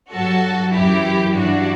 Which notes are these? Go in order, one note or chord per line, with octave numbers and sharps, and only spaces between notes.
G2 F#3 F#4 A4
F#2 E3 E4 G4
G2 E3 D4 F#4